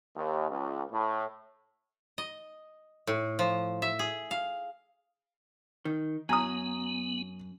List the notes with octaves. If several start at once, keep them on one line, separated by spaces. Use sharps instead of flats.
D#2
C#2
A2
D#5
A2
F3
E5
G#4
F5
D#3
F#2 B3 G#5 A#5 D#6